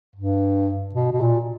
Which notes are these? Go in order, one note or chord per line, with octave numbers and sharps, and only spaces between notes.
G2
B2
B2
A#2